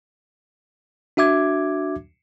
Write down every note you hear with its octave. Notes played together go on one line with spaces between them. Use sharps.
D4 F#4 E5 D6 G#6